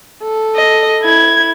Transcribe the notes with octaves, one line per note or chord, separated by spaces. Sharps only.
A4
D#5
E4 G#6